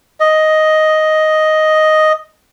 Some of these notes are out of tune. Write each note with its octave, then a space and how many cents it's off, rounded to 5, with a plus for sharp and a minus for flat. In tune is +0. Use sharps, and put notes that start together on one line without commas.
D#5 +5